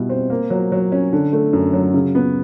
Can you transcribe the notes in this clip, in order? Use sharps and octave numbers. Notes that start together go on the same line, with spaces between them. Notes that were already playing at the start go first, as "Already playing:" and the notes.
Already playing: B2 G3 E4
C4
A#3
F#3
F#3
C#4
D3
A3
F#2
F#3
C#3
B3